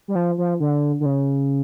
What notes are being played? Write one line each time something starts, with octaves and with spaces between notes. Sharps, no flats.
G3
F3
F3
D3
D3
C#3